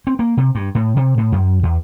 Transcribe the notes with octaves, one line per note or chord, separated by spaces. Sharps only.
C4
A#3
C3
G2
A2
C3
A2
F#2
E2